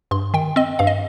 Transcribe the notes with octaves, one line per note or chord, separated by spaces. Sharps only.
G2 C6
D#3 G5
C4 D#5
G2 F5
D#5